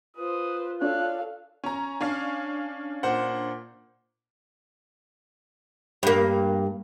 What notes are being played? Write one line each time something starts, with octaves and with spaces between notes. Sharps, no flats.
F4 B4 C5 D#6
D4 A4 C#5 F5 F#6
C#4 A#5
C#4 D4 F5
A#2 C5 F#5
G2 A#3